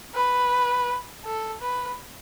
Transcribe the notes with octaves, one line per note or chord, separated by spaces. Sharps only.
B4
A4
B4